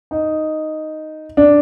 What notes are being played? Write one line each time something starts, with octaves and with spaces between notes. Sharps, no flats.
D#4
D4